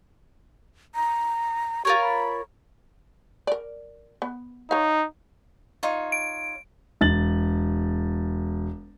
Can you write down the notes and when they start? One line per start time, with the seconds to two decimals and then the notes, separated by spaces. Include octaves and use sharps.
0.95 A#5
1.85 F4 G4 A#4 C#5
2.01 B5
3.47 A#4 D5
4.22 B3
4.71 D#4 C#5 F5
5.83 D#4 F4 C#5
6.12 D7
7.01 E1 A6 F#7